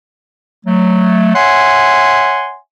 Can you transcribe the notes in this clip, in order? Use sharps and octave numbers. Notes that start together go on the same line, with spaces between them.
F#3 A3
C#5 E5 F#5 G#5 C6